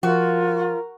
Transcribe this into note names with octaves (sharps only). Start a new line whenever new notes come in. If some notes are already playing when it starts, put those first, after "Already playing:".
F3 F4 F#4 A#4